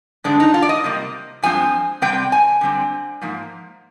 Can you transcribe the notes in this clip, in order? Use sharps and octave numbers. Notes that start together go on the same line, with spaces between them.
G2 D3 G#3 C4 D4
D#4
F4
D5
D#5
C3 G3 A#3
G2 F3 G#3 C4 G#5
C3 G3 C4 G5
G#5
D3 G3 C4
G#2 F3 A#3